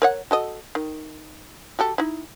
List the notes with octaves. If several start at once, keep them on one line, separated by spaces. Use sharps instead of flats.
A#4 C#5 F#5
F#4 A4 D#5
D#3
F#4 G4 A4
D#4 E4